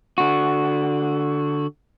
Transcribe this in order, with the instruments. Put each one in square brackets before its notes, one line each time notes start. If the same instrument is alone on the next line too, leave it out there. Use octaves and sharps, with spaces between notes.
[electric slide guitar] D3 F#4